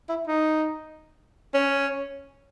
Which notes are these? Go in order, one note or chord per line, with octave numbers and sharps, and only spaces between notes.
E4
D#4
C#4